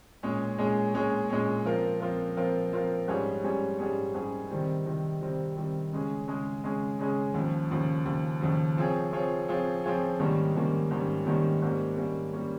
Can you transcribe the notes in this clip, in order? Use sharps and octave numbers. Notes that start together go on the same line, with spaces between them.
A#2 G#3 C#4 G#4 C#5
A#2 G#3 C#4 G#4 C#5
A#2 G#3 C#4 G#4 C#5
A#2 G#3 C#4 G#4 C#5
F3 C4 F4 A#4
F3 C4 F4 A#4
F3 C4 F4 A#4
F3 C4 F4 A#4
G#2 G3 C#4 G#4 C#5
G#2 G3 C#4 G#4 C#5
G#2 G3 C#4 G#4 C#5
G#2 G3 C#4 G#4 C#5
C3 D#3 G3 C4
C3 D#3 G3 C4
C3 D#3 G3 C4
C3 D#3 G3 C4
C#3 G#3 C#4 G#4
C#3 G#3 C#4 G#4
C#3 G#3 C#4 G#4
C#3 G#3 C#4 G#4
D#2 C#3 F3
D#2 C#3 F3
D#2 C#3 F3
D#2 C#3 F3
F3 C4 F4 G#4 C#5
F3 C4 F4 G#4 C#5
F3 C4 F4 G#4 C#5
F3 C4 F4 G#4 C#5
G#2 D#3 G3 A#3 C#4
G#2 D#3 G3 A#3 C#4
G#2 D#3 G3 A#3 C#4
G#2 D#3 G3 A#3 C#4
G#2 G3 A#3 C#4
G#2 G3 A#3 C#4
G3 A#3 C#4